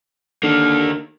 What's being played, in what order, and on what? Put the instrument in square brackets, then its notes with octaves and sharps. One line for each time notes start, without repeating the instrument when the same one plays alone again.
[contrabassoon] D3 [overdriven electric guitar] D#3 A#3